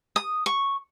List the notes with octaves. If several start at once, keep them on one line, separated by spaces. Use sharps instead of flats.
D#6
C#6